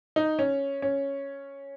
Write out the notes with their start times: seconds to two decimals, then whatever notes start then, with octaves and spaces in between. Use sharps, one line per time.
0.16 D#4
0.39 C#4
0.82 C#4